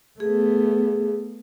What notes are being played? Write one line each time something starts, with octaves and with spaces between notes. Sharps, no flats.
A3 B3 G#4